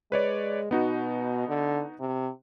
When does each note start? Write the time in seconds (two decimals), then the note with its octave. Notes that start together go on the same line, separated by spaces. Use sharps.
0.12 G#3 B4 C#5 D5
0.71 B2 B3 D#4 F#4
1.48 D3
2.00 C3